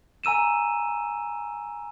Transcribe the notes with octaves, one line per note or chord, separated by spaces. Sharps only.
G#5 A#5 E6 D#7 E7